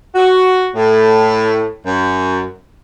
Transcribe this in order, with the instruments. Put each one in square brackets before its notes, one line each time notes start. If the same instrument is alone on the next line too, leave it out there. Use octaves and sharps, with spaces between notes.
[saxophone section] F#4
A2
F#2